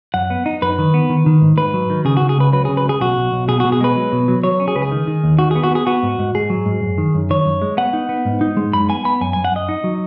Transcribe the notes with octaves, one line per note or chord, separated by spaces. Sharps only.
F#2 F#5
B3
D#4
F#2 B4
D#3
B3
D#3
D#3
G#2
G#2 B4
F#3
D#3
C#3 G#4
C#3 F#4
G#4
C#2 B4
F#3 B4
C#3 G#4
B4
C#2 G#4
B1 F#4
B1
B1
B2 G#4
B2 F#4
G#4
G#3 B4
F#3
B2
F#3
F#3 C#5
C#4
G#4
C#2 B4
G#4
D#3
D#3
D#2
D#3 F#4
B3 G#4
F#4
B3 G#4
B3 F#4
G#2
G#2
G#2 G#4
F#3
G#2
F#2
D#3
F#2
D#3 C#5
F#2
G#3
B3 F#5
D#4
B3
G#2
D#4
G#3
F#2 B5
B3 G#5
B3 B5
F#2 G#5
F#2 G#5
F#5
F#2 D#5
D#4
F#3